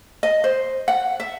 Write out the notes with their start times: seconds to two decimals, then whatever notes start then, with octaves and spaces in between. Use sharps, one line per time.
0.23 D#5
0.44 C5
0.88 F#5
1.20 E5